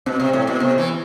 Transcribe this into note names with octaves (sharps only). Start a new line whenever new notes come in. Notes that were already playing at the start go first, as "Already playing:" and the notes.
B2 C4
C3
A2
B2
C3 B3
E3